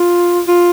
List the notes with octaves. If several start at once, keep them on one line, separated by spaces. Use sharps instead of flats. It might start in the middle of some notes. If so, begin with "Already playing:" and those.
Already playing: F4
F4